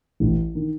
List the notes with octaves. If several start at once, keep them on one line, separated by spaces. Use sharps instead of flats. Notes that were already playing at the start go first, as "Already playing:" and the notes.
A1
D#3